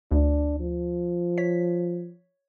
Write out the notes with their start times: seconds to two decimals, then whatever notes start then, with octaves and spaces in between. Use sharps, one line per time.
0.11 D2 D4
0.60 F3
1.38 C#5 B6